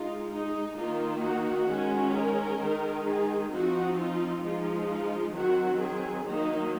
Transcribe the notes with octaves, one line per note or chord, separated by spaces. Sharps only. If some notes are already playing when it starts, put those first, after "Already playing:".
Already playing: G#3 D#4 F4
D#4
D#3 A#3 D#4 F4
F#4
D#3 G#3 C#4
A#4
D#3 G#3 D#4
G#4
F3 C4 D#4 F#4
F4
F3 G#3 D#4 F4
F4
D#3 F#3 C4 F#4
G#4
D#3 F#3 A#3 D#4